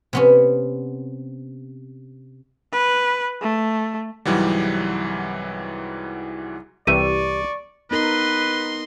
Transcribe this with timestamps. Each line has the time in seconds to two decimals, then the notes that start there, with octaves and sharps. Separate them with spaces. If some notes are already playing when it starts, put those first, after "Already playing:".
0.13 C3 B3 C#4
2.73 B4
3.41 A3
4.25 C2 G#2 E3 F#3 G3
6.87 C2 E3 G4 D5 E5 C#6 D#7
7.91 B3 D#4 A#4 B4 D#5 C6